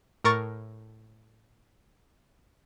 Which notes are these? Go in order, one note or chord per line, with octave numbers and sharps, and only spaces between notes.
A2 A#4 C#6 A6